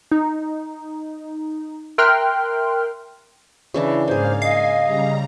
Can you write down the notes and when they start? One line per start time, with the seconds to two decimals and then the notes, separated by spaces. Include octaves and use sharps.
0.12 D#4
1.98 A#4 E5 G5 C6 F6 F#6
3.74 C#3 E3 D4 E4
4.08 G#2 A#3 G#4 C5 F5
4.42 D#5 F5 G#5
4.83 C#3 G3 A#5